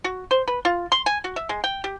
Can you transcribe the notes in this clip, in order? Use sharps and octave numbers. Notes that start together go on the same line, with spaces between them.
F#4
C5
B4
F4
C6
G#5
F#4
E5
G#3
G5
G4